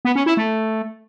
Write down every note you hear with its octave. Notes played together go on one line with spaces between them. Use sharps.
B3
C#4
E4
A3